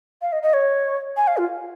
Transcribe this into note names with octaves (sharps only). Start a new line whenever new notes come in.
F5
D#5
D#5
C#5
G#5
F5
F4